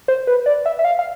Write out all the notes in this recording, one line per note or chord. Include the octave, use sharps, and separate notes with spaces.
C5
B4
D5
E5
E5
F5
F5